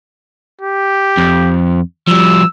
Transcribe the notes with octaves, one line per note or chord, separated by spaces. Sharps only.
G4
F2
F3 G3 E6